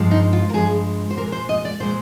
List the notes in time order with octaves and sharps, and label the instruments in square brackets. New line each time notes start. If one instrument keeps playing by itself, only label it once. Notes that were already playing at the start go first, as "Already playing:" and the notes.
Already playing: [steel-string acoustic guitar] G2 F3 G#3
D#4
F4
A#4
G2 F3 G#3 G#4
C5
A#2 A#4
G#3
C5
D#5
D5
A#2 G#3 C5